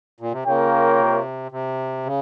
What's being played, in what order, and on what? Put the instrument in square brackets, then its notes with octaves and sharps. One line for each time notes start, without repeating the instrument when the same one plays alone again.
[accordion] A#2
C3
[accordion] C#3 [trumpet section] A#3 F4 A#4 C#5 G5
[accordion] C3
C3
C#3